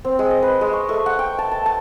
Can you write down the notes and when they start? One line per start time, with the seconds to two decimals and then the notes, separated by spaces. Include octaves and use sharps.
0.05 C4
0.19 G#3
0.30 D#5
0.43 B4
0.61 G#3
0.73 C#6
0.89 A3
1.06 F#5
1.19 G5
1.38 A5
1.51 A5
1.66 A5